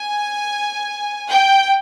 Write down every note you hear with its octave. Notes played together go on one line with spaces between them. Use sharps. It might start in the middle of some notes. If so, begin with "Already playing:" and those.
Already playing: G#5
G5